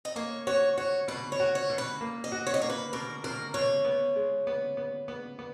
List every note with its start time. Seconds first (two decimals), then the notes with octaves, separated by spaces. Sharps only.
0.05 D#5
0.16 A#3 C#5
0.47 F#4 C#5
0.77 F#4 C#5
1.08 B2 B4
1.32 C#5
1.40 F#4
1.55 C#5
1.70 B2
1.78 B4
2.01 A#3
2.24 D#5
2.32 F#4
2.47 C#5
2.54 D#5
2.62 A#3 C#5
2.70 B4
2.93 B2 A#4
3.24 B2 A#4
3.54 B2 C#5
3.85 B3
4.16 G#3
4.47 B3
4.77 B3
5.08 B3
5.39 B3